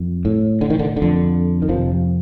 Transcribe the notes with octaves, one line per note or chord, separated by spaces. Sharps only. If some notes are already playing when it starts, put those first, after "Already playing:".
Already playing: F2
A2
D3
D#3
D3
D3
F2
D#3
F2 C3 F3